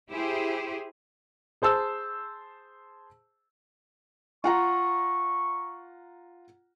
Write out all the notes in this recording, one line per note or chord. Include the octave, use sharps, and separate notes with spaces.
E4 G4 G#4 C5
G#4 C5 A5 E6
F4 F#5 A#5 C#6